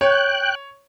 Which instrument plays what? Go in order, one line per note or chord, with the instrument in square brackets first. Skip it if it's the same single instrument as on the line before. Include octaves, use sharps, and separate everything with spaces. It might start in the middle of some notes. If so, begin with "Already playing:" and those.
[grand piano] C#5 [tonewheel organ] G5 F#6